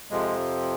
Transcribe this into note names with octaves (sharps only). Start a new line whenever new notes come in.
F2 C3 F3 G#3